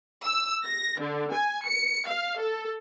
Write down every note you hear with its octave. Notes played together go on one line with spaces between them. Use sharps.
E6
A#6
D3
G#5
C#7
F5
A4